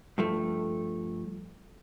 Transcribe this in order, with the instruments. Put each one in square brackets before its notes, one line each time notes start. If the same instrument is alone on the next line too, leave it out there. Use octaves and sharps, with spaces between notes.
[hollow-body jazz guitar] G2 F3 A3